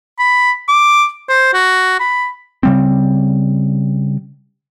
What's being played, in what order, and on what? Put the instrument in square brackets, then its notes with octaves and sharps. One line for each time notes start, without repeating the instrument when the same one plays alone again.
[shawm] B5
D6
C5
F#4
B5
[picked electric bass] C#3 G3 C4